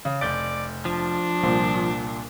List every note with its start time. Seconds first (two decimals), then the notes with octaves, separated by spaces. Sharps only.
0.05 C#3
0.21 F1 D5 G6 A6
0.85 F3 D4
1.43 C2 A#2 C5